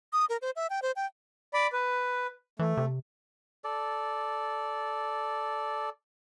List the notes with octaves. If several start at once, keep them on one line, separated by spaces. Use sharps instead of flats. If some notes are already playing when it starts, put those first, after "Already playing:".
D#6
A#4
C5
E5
G5
C5
G5
D5 B5
B4
E3 A3
C3
A4 D5